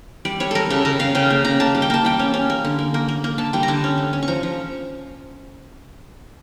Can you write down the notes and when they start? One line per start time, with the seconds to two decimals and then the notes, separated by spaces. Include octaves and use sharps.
0.25 G3 D5
0.40 G3 C#5
0.51 G3 A4 A#4
0.70 C#3 A4
0.85 C#3 A#4
0.99 C#3 F5
1.15 C#3 G5
1.30 A#3
1.45 C#3 A#5
1.60 A#3 A5
1.75 G3
1.82 G5
1.90 A#3 A5
2.05 G3 G5
2.19 C#4
2.34 C#4
2.50 A#3
2.65 D3
2.79 A#3
2.94 A#3
3.09 A#3
3.24 A#3
3.38 D3 A5
3.53 G3 G5
3.63 A#5
3.68 D3 A5
3.84 C#4
3.98 A3
4.13 C#4
4.23 C#6
4.28 F3 A#5
4.43 F3